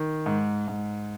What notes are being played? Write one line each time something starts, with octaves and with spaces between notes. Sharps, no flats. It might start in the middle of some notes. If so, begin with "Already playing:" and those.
Already playing: D#3
G#2
G#2